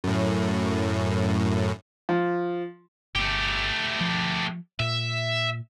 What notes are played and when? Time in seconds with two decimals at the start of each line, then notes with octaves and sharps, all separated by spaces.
0.04 F#2 A2
2.09 F3
3.15 G1 A3 G4
4.01 F3
4.80 A#2 E5